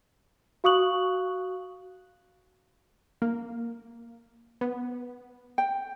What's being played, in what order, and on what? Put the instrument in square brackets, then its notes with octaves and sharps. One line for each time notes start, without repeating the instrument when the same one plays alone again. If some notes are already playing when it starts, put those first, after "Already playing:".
[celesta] F#4 F5 C#6 D#6 F#6 F#7
[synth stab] A#3
B3
[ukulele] G5